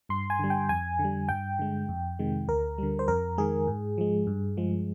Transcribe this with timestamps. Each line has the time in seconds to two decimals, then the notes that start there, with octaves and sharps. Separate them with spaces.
0.09 G2 C6
0.30 G#5
0.39 D3 G3
0.50 G5
0.69 F2 G#5
0.99 D3
1.04 G3
1.29 G2 G5
1.59 D3 G#3
1.89 F2
2.19 C3 D#3 G#3
2.48 D2 A#4
2.78 D3 G3
2.99 C5
3.08 F2 A#4
3.38 D#3 G#3 G#4
3.67 G#2
3.98 F3 G#3
4.27 G2
4.57 F3 G#3